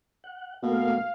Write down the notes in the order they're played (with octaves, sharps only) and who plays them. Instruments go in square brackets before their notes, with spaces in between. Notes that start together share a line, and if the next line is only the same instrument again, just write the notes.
[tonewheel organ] F#5
[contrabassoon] B2 [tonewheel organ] A3 A#3 [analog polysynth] F5